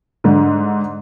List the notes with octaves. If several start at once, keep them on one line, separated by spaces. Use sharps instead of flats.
G#2 D3